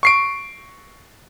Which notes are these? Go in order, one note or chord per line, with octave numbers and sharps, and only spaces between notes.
C#6 C7 D7